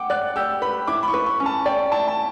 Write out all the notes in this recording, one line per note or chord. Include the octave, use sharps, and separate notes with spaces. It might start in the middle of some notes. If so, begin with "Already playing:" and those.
Already playing: F#5 G5 D6
D5 F#6
G4 E6
B4 B5
E4 D6
B5
C#6
B4
C#6
C#4
A5
D5 G5
E4 A5
A5